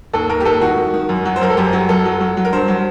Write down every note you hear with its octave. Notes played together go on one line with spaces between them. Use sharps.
D#2 A4
D#2 A#4
G4
D#2 A4
D#3 F#4
D#3
D#3
F#2
F#3
C5
F#2 A#4
A4
F#2 G4
F#3
F#2 A4
F#3
F#3
F#3
A#4
G2 C5
F#3